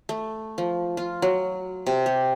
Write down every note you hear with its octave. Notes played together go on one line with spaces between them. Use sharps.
A3
F3
F4
F#3
C3
G4